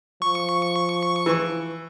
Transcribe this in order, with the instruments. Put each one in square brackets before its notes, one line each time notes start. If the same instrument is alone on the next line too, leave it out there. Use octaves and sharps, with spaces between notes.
[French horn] F3 [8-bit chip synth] C#6
[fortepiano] E3